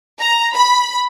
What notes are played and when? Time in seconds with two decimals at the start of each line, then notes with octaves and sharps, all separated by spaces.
0.19 A#5
0.54 B5